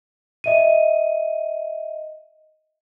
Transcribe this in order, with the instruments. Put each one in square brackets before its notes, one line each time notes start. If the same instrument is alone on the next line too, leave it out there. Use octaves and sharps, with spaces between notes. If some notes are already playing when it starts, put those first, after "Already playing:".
[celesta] D#5 E5 D#7